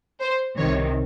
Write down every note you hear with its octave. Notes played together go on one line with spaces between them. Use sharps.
C5
C2 C3 D#3 C#5